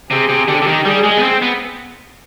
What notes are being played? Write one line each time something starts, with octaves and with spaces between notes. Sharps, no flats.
C3 G#4
C3
D3 G4
D3
D#3
G3 G#4
G#3
B3
C4
B3